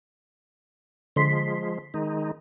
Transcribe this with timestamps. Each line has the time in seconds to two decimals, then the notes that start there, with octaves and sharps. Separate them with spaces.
1.16 D3 F3 G#3 C6 B6
1.94 D#3 G#3 D#4